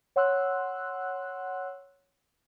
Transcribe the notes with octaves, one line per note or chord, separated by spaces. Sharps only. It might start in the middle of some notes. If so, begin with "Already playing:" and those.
C#5 F#5 C6 E6 F#6